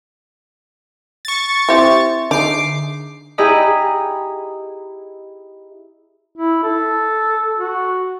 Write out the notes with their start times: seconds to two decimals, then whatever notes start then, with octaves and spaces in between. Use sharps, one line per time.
1.25 C#6 A6
1.69 C4 E4 G4 C5 E5 C6
2.31 D3 D#4 G#4 D6 C7
3.38 E4 G4 G#4 D#5 A#5 B5
6.36 E4
6.64 A4
7.58 F#4